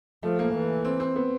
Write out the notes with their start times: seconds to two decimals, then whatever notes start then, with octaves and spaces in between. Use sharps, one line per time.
0.23 F3 A3
0.39 A#3
0.55 E3
0.85 C4
1.00 C4
1.16 B3